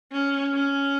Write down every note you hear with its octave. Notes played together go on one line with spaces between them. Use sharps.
C#4
C#4